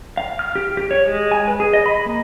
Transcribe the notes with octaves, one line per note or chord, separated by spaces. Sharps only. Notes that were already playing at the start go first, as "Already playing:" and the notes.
F5
F6
G4
G4
C#5
G#3
G#5
B4
G#4
D#5
B5
A#3